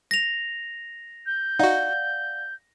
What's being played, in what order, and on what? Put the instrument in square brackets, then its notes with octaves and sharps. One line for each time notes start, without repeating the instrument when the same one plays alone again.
[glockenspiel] A#6 F7
[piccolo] G6
[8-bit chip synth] D#4 F#4 [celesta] D5 F5 F#5